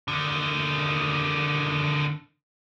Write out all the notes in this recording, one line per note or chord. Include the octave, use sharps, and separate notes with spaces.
D3 D#3